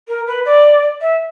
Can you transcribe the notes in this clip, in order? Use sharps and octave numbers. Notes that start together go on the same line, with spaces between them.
A#4
B4
D5
E5